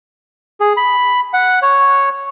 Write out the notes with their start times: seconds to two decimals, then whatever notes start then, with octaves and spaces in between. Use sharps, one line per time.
0.60 G#4
0.77 B5
1.34 F#5
1.62 C#5